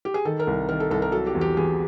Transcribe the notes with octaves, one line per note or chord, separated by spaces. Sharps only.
G4
G#4
D#3 A4
A#4
C2
D#3 A#4
A4
C2 A4
A#4
F#3 A4
G4
E2
G4
E2 G#4